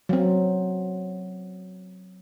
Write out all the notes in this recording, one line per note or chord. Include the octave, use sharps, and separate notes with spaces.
F#3 C4